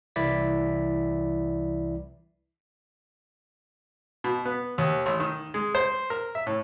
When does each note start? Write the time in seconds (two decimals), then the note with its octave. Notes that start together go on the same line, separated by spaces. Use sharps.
0.16 C2 E3 E4 D5 B6
4.24 B2
4.45 B3
4.78 D#2
5.06 A1
5.20 D#3
5.54 G#3
5.75 C5
6.10 A#4
6.35 E5
6.47 A2